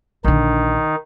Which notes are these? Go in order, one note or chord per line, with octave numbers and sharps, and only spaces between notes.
A#1 D3 D#3 D#4